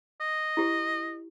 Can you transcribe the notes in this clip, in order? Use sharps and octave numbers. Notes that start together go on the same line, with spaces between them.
D#5
E4 G4